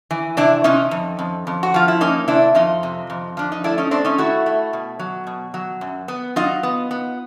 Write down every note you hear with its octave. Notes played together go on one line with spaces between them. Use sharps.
E3
C3 D4 E4
C3 C#4 D#4
F2
F2
F2
F#4
F3 F4
E4
A#3 C#4 D#4
C3 D4 E4
F2 D#4 F4
C3
F2
F3 D4
D#4
A3 D4 E4
C#4 D#4
A3 C4 D4
C#4 D#4
A3 E4 F#4
A3
B2
F#3
B2
F#3
F#2
B3
F#3 D#4 F4
B3
B3